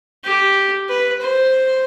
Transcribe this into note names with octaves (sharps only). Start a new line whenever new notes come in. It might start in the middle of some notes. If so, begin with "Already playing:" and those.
G4
B4
C5